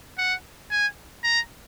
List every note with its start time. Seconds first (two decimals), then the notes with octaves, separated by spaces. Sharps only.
0.18 F#5
0.71 G#5
1.24 A#5